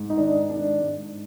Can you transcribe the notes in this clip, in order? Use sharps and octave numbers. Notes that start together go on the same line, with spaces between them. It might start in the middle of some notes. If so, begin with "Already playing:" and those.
Already playing: G#2
D#4
D#3 D4
G#2 D4
G#2